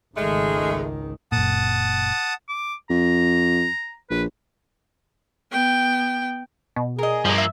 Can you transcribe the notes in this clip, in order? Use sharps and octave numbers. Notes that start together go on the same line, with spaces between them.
G#1 C#2 D#3 G#3 A3
F#1 A#2 F#5 A5 D#6
D6
F2 A#5
A#1 B4
B3 G5
B2
G#4 A#4 D#5
G2 F3 A#3
E5